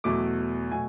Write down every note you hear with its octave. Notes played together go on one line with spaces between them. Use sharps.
E2 B2 F#3 A3 D6
B2 F#3 A3 G#5